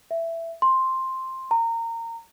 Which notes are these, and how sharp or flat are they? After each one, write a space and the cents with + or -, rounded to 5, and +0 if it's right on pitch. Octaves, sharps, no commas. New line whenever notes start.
E5 +10
C6 +5
A#5 -25